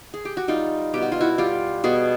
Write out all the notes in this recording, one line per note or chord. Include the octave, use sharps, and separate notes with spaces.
G#4
G4
F#4
G3 D#4 F4
B2 G4
F#4
F4
E4 F#4
G3 F4 G4
B2 F#4 G#4